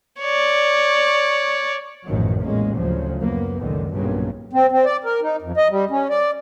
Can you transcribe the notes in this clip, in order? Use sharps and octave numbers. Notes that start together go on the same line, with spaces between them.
C#5 D5
A1 F#2 B2 D#3 F3 F#3
A1 E2 A#2 G#3 A#3 C#4
A1 D2 C#3 F3 F#3
F#2 A#3 B3
C#2 F#2 A#2 D3 D#3
B1 G2 A#2 C#3 F#3 A#3
C4
C4
D5
A#4
D#4
F2
D#5
G3
C#4
D5